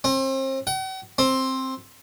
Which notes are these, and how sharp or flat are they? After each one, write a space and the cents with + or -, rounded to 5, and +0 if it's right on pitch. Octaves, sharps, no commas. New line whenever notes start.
C4 +35
F#5 +45
C4 +10